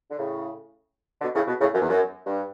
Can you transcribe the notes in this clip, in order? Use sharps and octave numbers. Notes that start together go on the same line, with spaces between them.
D3
A2 C#3
B2 D3
A2 C#3
B2
A2 C#3
F#2
E2
F#2
G2